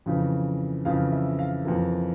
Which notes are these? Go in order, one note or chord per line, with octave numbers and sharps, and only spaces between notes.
F2 C#3 E3
F2 C#3 E3 F5
E5
F5
F2 E3 A#3